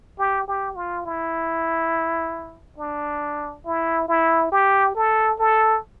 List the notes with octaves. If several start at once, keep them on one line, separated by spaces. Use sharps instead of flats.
G4
G4
F4
E4
D4
E4
E4
G4
A4
A4